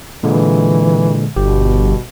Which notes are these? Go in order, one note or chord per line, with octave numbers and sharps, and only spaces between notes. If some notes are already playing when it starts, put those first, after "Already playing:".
A#2 D3 E3 G#3
G1 B2 G4